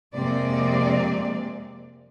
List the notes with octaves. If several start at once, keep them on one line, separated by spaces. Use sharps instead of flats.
F2 C3 G#3 A#3 C4 D5